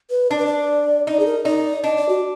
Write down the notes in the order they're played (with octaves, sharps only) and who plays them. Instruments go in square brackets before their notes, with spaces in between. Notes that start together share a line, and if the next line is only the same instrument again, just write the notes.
[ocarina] B4
[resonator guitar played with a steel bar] D4 [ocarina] D5
[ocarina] B4
D5
[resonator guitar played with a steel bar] D#4 [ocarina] D5
[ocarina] G#4
A#4
[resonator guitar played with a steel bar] D#4 [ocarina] D5
[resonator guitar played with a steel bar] D4 [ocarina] D#5
[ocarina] D5
F#4